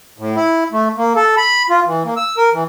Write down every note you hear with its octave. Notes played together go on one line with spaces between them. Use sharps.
A2
E4
A3
A#3
A4
B5
F4
E3
A#3
E6
A#4
E3